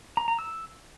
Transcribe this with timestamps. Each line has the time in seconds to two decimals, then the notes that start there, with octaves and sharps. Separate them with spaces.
0.17 A#5
0.28 A#5
0.39 E6